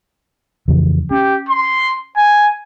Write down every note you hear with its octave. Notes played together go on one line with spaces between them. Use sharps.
F2 C#3 E3
C#4 G4
C6
G#5